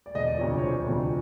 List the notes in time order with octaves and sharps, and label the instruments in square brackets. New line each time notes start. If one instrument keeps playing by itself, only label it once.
[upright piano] D5
E1 D#5
D5
D2 C3 F3 C#5
C#5
E1 C5
D2 C3 F3